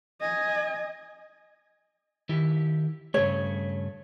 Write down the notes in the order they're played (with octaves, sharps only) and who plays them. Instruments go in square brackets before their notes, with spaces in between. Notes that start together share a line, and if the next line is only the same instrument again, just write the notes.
[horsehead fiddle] D#5 G#5
[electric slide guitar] D#3 E4 G4
[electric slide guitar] G2 C#3 A3 [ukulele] C#5